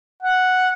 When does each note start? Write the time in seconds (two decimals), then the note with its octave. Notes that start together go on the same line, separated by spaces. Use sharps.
0.23 F#5